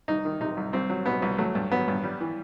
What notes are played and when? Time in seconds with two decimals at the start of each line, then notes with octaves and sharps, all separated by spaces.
0.08 C2 D#4
0.25 D#3
0.41 C3 D#4
0.57 C2
0.73 C2 C4
0.90 F#3
1.06 B2 B3
1.22 C2
1.38 F#3 A3
1.55 G2
1.72 F#3 B3
1.88 G2
2.04 G3
2.20 E3